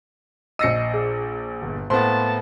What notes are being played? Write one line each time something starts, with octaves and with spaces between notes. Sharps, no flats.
A#1 D#5 E6 A#6 C7 C#7 D#7
G#4
G1
A2 A#3 B3 C5 A5 C6